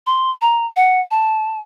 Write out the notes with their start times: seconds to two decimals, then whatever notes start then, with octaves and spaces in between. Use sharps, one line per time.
0.07 C6
0.42 A#5
0.76 F#5
1.11 A5